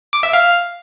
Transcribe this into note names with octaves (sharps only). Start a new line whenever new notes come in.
D6
E5
F5